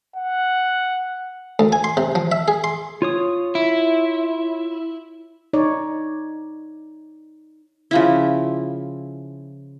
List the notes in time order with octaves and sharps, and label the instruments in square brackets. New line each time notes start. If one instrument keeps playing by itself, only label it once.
[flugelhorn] F#5
[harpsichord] D2
G#5
C6
C3
F3
E5
G#4
C6
[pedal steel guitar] F4 C#5 D#6
[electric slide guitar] E4
[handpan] D#4 C#5 D5
[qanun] C#3 F3 E4